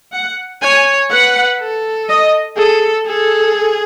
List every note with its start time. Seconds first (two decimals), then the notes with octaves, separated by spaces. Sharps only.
0.13 F#5
0.62 C#5 G#5
1.11 B4 F#5
1.60 A4
2.09 D#5
2.57 G#4 A4
3.07 G#4 A4